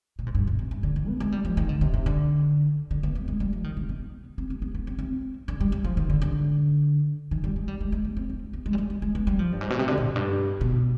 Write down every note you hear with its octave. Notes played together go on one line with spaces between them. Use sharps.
B2
G#2
G2
B2
C3
G2
D3
D#3
B3
G#3
G3
F3
D#3
D3
C3
C3
D3
D3
B3
B3
G#3
G3
F3
D#3
C3
B3
C4
B3
B3
B3
C4
C4
D3
G3
G3
F3
D#3
D3
D3
D#3
G3
G#3
G3
G#3
G#3
B3
C4
B3
B3
G#3
G3
G#3
G#3
G#3
B3
G3
F3
G2
G#2
B2
C3
D3
B2
F2
G2
B2